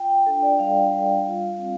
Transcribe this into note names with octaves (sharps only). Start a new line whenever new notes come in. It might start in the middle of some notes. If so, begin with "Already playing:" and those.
Already playing: F4 G5
G5
D4 A4
D5
G3 F5
G3
F4
C4